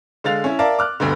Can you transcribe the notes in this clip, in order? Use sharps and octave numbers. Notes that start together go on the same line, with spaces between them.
D3 G#3 F5 A6 F7
C#4 E4
A#4 D5 E5 F5 A5
D6 F6 F#6
D2 G2 B2 D3